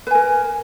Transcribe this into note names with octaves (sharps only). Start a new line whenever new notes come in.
A#4 B4 G#5